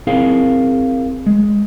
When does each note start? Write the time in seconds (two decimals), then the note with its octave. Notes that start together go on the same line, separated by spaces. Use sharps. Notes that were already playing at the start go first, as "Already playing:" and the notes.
0.07 C4 E4 G#4 A#4 F5
1.26 G#3